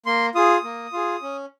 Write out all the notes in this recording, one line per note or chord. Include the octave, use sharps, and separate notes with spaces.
A#3 C6
F4 G#4 D#6
A#3
F4 G#4
C#4